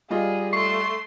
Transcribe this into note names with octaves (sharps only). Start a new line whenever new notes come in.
G3 F4 G#4 D#5
A3 C6 C#6 C7